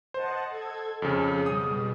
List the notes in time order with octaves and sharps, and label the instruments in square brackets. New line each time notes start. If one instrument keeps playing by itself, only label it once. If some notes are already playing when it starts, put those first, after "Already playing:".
[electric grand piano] C5 [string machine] D#5 F#5 A5
[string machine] A4 G#6
[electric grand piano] F2 C#3 [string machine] G#4
[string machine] B2 G3 [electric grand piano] D#6